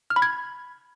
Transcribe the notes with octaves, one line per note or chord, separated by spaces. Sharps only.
F6
B5
G#6